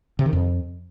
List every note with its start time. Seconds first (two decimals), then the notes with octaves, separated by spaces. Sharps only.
0.19 C3
0.26 D#3
0.33 F2